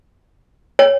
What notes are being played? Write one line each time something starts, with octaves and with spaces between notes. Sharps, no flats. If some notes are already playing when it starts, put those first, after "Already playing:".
C#5